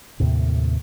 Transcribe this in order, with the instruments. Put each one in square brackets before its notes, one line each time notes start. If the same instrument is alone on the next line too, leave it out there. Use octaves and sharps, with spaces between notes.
[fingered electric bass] D#2 A2 C3